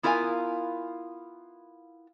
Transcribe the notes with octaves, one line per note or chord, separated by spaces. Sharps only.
B3 E4 F4 A#4 F5 G#5